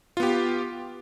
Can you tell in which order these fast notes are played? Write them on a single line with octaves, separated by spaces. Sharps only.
F4 B3 G4